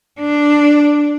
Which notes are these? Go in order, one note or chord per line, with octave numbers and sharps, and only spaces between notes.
D4